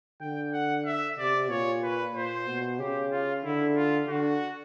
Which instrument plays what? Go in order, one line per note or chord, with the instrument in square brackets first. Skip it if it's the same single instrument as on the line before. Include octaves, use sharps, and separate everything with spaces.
[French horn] D3 [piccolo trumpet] G5
[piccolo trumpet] F#5
E5
[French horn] C3 [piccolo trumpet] D5
[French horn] A#2 [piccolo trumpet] C#5
[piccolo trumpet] B4
[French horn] A#2 [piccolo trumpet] C5
[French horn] B2
[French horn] C#3 [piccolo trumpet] G4
[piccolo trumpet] F4
[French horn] D3 [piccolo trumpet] E4
[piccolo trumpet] F4
[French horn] D3 [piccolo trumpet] F#4